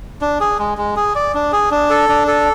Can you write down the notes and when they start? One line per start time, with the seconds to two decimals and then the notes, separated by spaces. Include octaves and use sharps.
0.21 D4
0.40 G#4
0.59 G#3
0.78 G#3
0.96 G#4
1.15 D5
1.35 D4
1.52 G#4
1.71 D4
1.90 A4
2.09 D4
2.28 A4